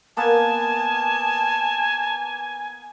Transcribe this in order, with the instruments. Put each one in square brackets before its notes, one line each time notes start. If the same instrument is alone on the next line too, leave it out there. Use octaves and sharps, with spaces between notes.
[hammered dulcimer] A#3 B3 [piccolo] G#5 [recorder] A5